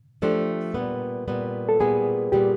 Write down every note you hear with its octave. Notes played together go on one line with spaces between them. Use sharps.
F3 A3 D4 G4 C5
A#2 G3 B3
A#2 G3 B3
A4
A#2 G3 B3 G#4
A#2 G3 B3 G4